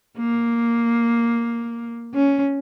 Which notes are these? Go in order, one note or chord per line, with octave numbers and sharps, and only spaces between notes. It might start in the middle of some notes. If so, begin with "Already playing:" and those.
A#3
C#4